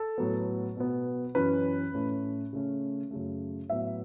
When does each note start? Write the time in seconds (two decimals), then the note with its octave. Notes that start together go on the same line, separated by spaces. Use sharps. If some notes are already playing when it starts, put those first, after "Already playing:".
Already playing: A4
0.18 A2 F#3 B3
0.77 B2 B3
1.35 F#2 E3 C#4 B4
1.93 A2 A3 C#4
2.53 C#3 A3 C#4
3.11 F#2 C#3 A3
3.70 A2 F#3 B3 E5